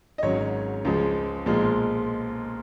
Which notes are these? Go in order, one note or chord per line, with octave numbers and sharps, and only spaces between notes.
D#5
G#1 G#2 F#3 C#4 C#5
C#2 C#3 F3 G#3
B1 A#2 F3 G#3